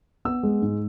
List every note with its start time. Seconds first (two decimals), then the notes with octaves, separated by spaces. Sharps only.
0.25 B3 E6
0.43 G#3
0.62 G#2